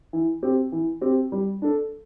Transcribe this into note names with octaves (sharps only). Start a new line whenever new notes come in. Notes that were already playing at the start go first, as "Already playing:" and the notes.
E3
C4 G4
E3
C4 G4
G3
D4 A4